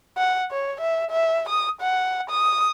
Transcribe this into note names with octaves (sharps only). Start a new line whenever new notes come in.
F#5
C#5
E5
E5
D#6
F#5
D#6